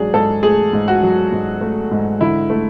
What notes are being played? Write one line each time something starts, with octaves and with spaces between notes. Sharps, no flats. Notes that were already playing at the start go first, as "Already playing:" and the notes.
Already playing: G#2 F#3 D4 G#4
G#2 A4
A3 G#4
G#2
F#4
F#3
G#2
A3
G#2
D3 E4
A3